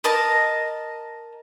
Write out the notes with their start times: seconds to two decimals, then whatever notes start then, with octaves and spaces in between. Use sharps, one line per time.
0.04 A#4 D#5 A5 A#5